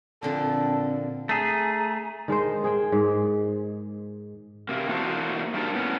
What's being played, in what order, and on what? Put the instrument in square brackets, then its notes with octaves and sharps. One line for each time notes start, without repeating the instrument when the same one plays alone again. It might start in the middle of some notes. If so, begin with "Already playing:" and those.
[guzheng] A#2 D3 F3 [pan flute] C4 [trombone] A4
[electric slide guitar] A3 G#4 [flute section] A#5
[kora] D#3 G#3 D#4 C5
G#4 C5 G5
G#2
[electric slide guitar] C3 A#3
E3 A#3 D4 F#4 A4 C5
G2 D#3 A#3 D4 A#4 A5
A2 B3 C#4